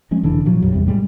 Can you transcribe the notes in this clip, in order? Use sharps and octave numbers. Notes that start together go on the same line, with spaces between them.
F3 G#3 C#4
F1 D3 E3 D4
A#2 F3 F#3
A#1 F#2 G3
E2 C3 G3
A2 G3 G#3